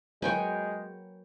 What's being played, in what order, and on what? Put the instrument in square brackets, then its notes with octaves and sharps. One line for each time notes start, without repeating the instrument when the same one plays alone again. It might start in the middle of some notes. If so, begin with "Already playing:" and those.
[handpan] F#3 A#4 B4 [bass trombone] G#3 [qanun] C#5 G5 G#5